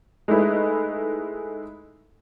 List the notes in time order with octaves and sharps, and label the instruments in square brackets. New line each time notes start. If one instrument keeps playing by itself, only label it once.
[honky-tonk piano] G#3 A3 D#4 E4 B4